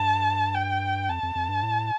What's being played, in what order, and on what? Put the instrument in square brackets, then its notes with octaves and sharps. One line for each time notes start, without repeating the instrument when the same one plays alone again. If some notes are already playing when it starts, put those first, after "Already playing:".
Already playing: [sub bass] G2 [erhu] A5
[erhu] G5
[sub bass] F2 [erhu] A5
[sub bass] F2
F2
G2
A2